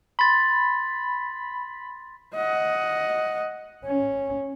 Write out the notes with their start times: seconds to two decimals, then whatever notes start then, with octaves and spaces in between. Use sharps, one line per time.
0.19 B5 C6 A6
2.35 D#5 F#5
3.86 C#4